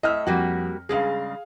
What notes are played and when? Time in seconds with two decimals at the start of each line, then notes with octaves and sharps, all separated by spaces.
0.03 A2 D#5 E5 F6
0.27 F2 G3 A#3 F#4
0.89 G2 C#3 G#3 G#4 F5